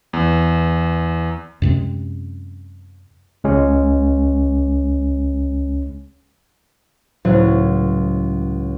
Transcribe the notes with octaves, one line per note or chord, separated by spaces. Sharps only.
E2
F#2 C3 G#3
C#2 G#3 C#4
C#2 A2 F#3